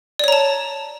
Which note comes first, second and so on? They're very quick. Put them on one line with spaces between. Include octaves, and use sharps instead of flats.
D5 C#5 A#5 A5